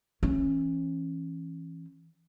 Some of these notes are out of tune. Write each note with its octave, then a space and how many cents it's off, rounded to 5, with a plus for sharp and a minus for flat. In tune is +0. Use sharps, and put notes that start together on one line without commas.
E3 +0 C#4 -25